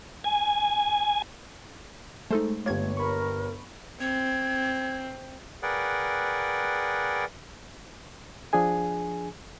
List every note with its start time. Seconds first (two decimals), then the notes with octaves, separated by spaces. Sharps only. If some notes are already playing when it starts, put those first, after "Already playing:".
0.24 G#5
2.31 G#3 A3 D#4 A4 C5
2.66 G1 A#3 G4 C#5 G#6
2.97 A#4 B5 C#6
4.00 C4 G#6
5.63 G#4 A#4 B4 D5 F#5 G5
8.53 F3 D4 G#4 G#5